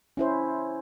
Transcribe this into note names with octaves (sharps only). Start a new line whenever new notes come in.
C#4 E4 C5